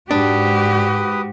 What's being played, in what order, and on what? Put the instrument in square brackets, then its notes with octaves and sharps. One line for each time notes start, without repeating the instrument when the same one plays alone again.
[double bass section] G#2 [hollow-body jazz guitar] D4 [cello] F#4 G4 [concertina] B4 D#6